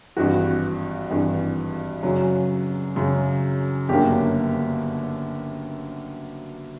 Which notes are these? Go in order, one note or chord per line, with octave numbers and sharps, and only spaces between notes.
G#1 G2 E3 F#4
G#1 G2 E3
F#2 C#3 F#3
F#2 C#3 F#3
G1 F#2 D3 F#3 A#3 G4